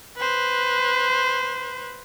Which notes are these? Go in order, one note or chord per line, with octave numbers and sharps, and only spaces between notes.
B4 C5